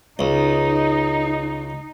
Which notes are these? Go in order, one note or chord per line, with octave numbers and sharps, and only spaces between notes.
C#2 D#4